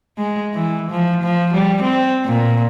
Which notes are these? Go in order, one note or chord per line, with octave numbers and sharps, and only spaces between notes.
G#3
E3
F3
F3
G3
C4
A#2